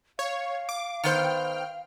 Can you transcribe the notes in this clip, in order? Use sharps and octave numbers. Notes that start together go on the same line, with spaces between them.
C#5 F5
D6
D#3 B3 C5 G5 F6